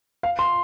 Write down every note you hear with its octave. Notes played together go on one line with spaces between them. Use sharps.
F5
C6